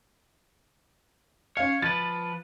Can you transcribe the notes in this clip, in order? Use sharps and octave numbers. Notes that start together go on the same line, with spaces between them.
C#4 C#5 F5
F3 B4 A6